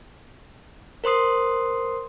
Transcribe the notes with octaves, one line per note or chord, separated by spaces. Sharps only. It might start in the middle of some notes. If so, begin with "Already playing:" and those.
A#4 C5 C6 D#6 C7